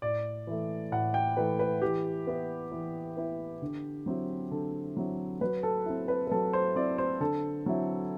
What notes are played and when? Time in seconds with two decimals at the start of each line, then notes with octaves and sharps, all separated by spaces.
0.02 A2 D5
0.47 E3 A3
0.92 A2 F#5
1.14 G5
1.37 E3 A3 B4
1.59 B4
1.82 E3 G4
2.27 B3 E4
2.72 E3
3.17 B3 E4
3.62 D3
4.06 F#3 C4 E4
4.51 D3 A4
4.97 F#3 C4 E4
5.41 F#3 B4
5.63 A4
5.86 C4 E4
6.08 B4
6.27 B4
6.31 F#3 A4
6.53 C5
6.76 C4 E4 D5
6.98 C5
7.20 D3 A4
7.66 F#3 C4 E4